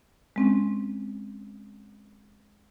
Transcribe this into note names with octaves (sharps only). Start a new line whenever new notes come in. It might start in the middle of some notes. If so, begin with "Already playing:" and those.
G#3 C4 C#4